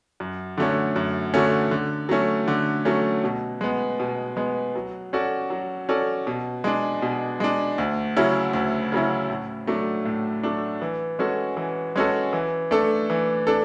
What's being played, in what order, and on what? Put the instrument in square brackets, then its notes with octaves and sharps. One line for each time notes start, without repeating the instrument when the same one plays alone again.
[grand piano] F#2
D3 F#3 A3 C#4
F#2
D3 F#3 A3 C#4
D3
F#3 A3 C#4
D3
F#3 A3 C#4
B2
G#3 B3
B2
G#3 B3
F#3
C#4 F#4 A4 D5
F#3
C#4 F#4 A4 D5
B2
G#3 D4
B2
G#3 D4
D2
C#3 F#3 C#4 E4
D2
C#3 F#3 C#4 E4
A2
F#3 A3 D4
A2
F#3 A3 D4
E3
G#3 C#4 F#4 A4
E3
G#3 C#4 F#4 A4
E3
A3 D4 A4
E3
D4 A4